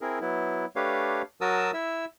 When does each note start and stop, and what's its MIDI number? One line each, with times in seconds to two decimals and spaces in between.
0.01 0.19 60
0.01 0.19 64
0.01 0.19 68
0.01 0.19 70
0.21 0.65 54
0.21 0.65 59
0.21 0.65 64
0.76 1.22 57
0.76 1.22 62
0.76 1.22 67
0.76 1.22 71
0.76 1.22 73
0.76 1.22 77
1.41 1.71 54
1.41 1.71 66
1.41 1.71 70
1.41 1.71 81
1.41 1.71 87
1.41 1.71 88
1.74 2.05 64
1.74 2.05 76
1.74 2.05 88